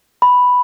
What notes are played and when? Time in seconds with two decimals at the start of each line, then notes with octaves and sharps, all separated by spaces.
0.22 B5